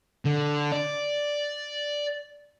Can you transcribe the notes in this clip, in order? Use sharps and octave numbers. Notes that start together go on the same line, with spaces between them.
D3
D5